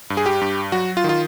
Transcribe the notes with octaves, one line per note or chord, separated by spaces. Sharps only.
G2
G#4
G4
G2
F#3 F#4
F4
D#3
F4